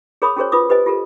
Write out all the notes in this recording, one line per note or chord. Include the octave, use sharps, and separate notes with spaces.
G#4 A#4 C#5 B5 D6 D#6
C#4 F#4 G#4 A#4 C5 C#5
F4 B4 D6 D#6
G4 B4 C5 D#5 G#5
F4 G4 A4 A#4